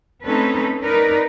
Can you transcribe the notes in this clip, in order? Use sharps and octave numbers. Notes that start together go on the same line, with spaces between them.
A3 C4 C#4 D#4 A4 B4
D#4 A#4 B4 D5